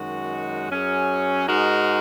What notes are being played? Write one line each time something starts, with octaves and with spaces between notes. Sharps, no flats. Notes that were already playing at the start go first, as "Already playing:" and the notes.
Already playing: F#2 D#3 G#3 F#4
F#2 F#3 C#4 G#4
G#2 G#3 D#4 F#4 A#4